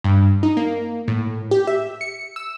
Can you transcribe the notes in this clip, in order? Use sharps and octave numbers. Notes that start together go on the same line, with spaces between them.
G2
D#4
A#3
A2
G4
E5
C#7
E6